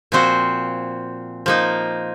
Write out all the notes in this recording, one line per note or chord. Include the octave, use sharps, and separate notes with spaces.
A#2 F3 C4 F#4 C5
F3 A#3 D#4